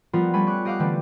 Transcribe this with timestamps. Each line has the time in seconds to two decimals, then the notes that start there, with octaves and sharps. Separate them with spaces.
0.13 F3 G3 B3 F4 A#4 F#5
0.34 G3 A3 C#4 G#5 B5
0.47 C#5 D6 F#6
0.65 G4 D#5 F5 F#5 D6 F#6
0.80 D3 E3 G3 A3 C4